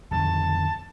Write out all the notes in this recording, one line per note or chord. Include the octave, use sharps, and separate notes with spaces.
D1 F2 D#3 A5